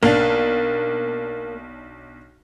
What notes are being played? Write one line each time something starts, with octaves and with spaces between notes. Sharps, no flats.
B1 A#3 D4